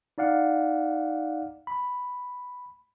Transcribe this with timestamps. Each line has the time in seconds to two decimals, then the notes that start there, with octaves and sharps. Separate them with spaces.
0.18 D#4 D5 F5 F#5
1.67 B5